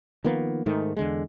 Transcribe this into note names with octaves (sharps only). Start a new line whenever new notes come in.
D#3 F3 A#3 B3
G#2 D#3 A3
E2 D3 G#3